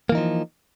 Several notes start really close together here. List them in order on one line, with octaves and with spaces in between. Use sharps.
A#3 E3 D#4 F3